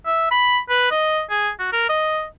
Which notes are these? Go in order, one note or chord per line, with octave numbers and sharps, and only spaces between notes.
E5
B5
B4
D#5
G#4
F#4
A#4
D#5